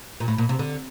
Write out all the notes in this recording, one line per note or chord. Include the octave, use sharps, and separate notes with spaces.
A#2
A2
A#2
C3
D3